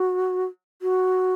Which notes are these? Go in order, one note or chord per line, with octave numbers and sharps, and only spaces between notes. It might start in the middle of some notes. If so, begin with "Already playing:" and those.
Already playing: F#4
F#4